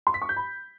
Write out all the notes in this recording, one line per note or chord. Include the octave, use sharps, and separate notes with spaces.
C6
B6
C#6
G6
B5